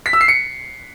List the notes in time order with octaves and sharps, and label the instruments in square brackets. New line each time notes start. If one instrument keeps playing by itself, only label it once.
[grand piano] B6
E6
C7
C#7